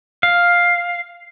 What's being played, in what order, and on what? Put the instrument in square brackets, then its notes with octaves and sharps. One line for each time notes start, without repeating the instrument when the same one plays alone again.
[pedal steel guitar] F5